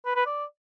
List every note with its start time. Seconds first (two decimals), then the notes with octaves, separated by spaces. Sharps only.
0.06 B4
0.16 B4
0.26 D5